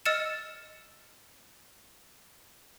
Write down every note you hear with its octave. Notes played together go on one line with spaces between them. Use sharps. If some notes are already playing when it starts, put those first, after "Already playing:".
D#5 E6 F6 A6 C#7 E7